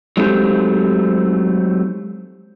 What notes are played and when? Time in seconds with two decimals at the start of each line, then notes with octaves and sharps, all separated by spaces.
0.17 F#3 G#3 A3 C4 D#4 G4